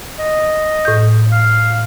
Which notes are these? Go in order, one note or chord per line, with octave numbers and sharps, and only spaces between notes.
D#5
A2 G6
F5